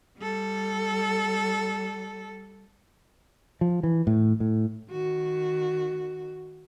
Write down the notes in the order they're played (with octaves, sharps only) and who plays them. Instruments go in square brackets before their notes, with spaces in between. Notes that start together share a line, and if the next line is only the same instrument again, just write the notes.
[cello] G3 A4
[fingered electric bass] F3
E3
A2
A2
[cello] D#3 F#4